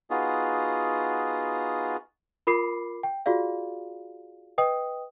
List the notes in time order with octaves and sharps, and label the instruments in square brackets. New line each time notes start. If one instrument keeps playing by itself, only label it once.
[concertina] B3 D#4 F4 F#4 G#4
[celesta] F4 A#4 B5 D6 C7
G5
F4 F#4 G#4 D5 F5
B4 D#5 G5 D#6